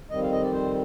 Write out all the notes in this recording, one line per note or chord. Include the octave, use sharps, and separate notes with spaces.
F2 D#3 G3 C4 D#5
F5
D#5
D5
C5